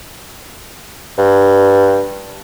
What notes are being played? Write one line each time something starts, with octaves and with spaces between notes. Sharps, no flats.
G2